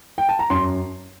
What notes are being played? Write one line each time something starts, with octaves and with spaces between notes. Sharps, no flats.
G5
A5
A#5
F#2 C6